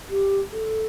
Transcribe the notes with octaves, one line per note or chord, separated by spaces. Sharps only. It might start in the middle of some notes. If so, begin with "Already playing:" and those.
G4
A4